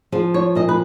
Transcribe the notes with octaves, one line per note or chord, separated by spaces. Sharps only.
F3 G#4
C#5
A#2 D#5
B4